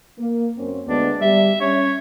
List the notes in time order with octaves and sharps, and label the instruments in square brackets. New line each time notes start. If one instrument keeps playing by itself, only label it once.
[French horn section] A#3
F#2 C4 C#4
[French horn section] D2 G#3 B3 [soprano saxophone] D4
[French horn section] G3 [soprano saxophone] E5
[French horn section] C#4 [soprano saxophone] C#5